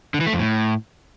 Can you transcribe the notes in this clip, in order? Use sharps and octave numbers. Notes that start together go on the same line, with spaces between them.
D3
E3
A3
F2
A2